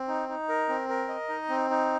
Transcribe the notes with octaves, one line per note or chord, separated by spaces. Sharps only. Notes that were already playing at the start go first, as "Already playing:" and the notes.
Already playing: C4
D#4
D#4
A#4
C4
A#4
D#5
D#4
C4
D#4